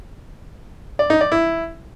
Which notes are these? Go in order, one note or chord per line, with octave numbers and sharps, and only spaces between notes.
D5
D#4
D5
E4